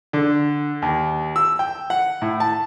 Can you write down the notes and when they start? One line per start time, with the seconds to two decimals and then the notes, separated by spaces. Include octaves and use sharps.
0.13 D3
0.82 D#2
1.36 E6
1.59 G5
1.90 F#5
2.22 A2
2.40 A5